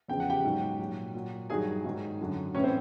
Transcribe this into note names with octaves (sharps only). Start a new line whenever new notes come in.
E2 C#3 F3 G5
F#5
G4 G5
G#2 D#3 F#3
A#2 F#3
A#2 F#3
G2 D#3 F#3 G#4 G#5
G#2 D#3 F#3
F#2 D3 F#3
A2 E3 C#4 C#5
C4 C5